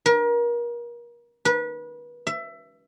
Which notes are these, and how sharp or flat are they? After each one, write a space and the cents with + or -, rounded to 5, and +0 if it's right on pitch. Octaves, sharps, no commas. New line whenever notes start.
A#4 +35
B4 -30
E5 +20